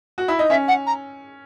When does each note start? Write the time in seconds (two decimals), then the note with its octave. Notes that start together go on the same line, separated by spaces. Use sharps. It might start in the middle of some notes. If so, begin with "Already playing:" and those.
0.18 F#4
0.28 E4
0.39 D#4
0.50 C#4 E5
0.68 F#5
0.87 A#5